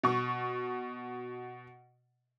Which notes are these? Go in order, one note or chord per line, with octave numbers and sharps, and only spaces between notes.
B2 C#6